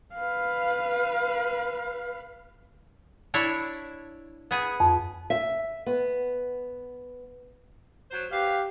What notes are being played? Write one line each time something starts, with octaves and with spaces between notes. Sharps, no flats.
B4 F5
D4 E4 C#5
B3 G#4
F2
E5
B3
F#3 C5
B3 G4 F5